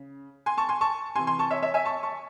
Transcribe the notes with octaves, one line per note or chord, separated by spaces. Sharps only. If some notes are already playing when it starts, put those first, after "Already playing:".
Already playing: C#3
G#5 C6
A5 C#6
G#5 C6
A5 C#6
C3 E3 G#5 C6
G#5 C6
A5 C#6
C#5 E5
C#5 E5
E5 G#5
A5 C#6
A5 C#6